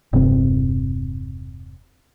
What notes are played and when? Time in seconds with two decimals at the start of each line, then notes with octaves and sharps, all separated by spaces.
0.13 E1 G2 C3 C4